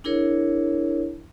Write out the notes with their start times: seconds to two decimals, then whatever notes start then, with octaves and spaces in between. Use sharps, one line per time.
0.04 D4 E4 G#4 A#4 C#5